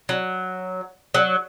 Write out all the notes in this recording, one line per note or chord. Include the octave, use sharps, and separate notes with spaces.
F#3
F#3